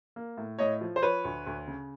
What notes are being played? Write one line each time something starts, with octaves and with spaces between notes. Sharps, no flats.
A#3
A2
A2 C#5 D#5
F3
C5
F3 B4 C#5
D2
D2
C#3